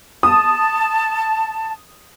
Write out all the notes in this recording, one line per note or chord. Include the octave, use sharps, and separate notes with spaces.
A5 D#6